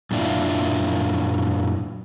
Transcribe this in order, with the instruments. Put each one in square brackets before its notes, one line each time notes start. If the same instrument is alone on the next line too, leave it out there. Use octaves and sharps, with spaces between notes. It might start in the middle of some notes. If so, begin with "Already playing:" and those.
[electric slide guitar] F#2 A#2 D4 E4 F4